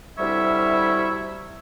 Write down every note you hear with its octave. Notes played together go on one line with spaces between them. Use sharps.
D2 C3 G3 E4 C#5 E5